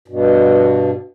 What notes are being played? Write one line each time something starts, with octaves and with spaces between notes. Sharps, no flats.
G2 B2